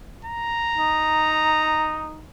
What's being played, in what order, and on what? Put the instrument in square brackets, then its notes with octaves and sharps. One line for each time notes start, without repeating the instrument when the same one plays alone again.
[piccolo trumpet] A#5
[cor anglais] D#4